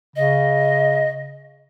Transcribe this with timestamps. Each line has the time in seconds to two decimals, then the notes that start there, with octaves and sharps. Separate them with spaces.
0.16 C#3 D#5